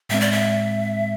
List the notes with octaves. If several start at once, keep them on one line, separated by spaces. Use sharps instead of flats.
A2 G#3 C4 E5
D5
E5